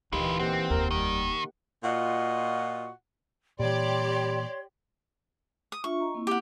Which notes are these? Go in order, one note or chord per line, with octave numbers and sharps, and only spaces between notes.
D#1 D2 E3 D#4 F4 G4 A#4 B4
A#3 C4 G4 F#5
F1 D#2 A#4
D#3 G3
A#2 F4 F#4 D#5 F#5
A#2 E3 G3 G4 C#5 D5 C6
D#6
D4 F4 E5 C#6
D#5 A#5
A#3 C4 E4
G4 F#5